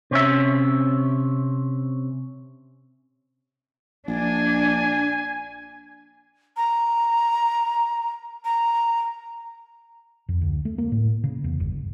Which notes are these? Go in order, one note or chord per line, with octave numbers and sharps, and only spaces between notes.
C3 C#4 E5
A#1 D4 G#5
A#5
A#5
F2
D2
A3
A#3
A2
C#3
E2
G1